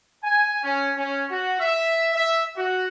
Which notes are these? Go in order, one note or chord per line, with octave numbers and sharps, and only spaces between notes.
G#5
C#4
C#4
F#4
E5
E5
F#4